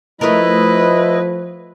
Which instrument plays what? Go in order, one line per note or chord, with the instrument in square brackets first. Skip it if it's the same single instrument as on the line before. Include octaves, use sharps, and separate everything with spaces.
[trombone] F3 [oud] A3 A#4 [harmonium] E4 D#5 [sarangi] B4